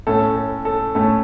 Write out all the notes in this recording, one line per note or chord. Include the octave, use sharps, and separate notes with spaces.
A2 A3 C#4 A4
A4
A4
A2 A3 C#4 A4